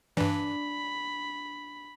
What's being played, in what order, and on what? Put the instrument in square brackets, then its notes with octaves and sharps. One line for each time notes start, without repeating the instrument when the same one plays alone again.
[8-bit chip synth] G2 E3 [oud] D4 [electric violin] B5